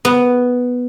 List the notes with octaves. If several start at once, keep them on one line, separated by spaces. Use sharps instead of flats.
B3